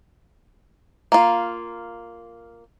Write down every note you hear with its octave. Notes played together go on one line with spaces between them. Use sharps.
A#3 F4